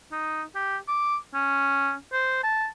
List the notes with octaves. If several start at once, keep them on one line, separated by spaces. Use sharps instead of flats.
D#4
G4
D6
C#4
C5
A5